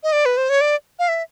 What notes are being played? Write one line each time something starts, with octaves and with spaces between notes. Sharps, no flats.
D#5
D5
B4
C5
C#5
D5
F5
E5